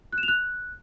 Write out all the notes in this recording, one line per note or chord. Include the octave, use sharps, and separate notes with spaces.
F#6
E7
F7
F#6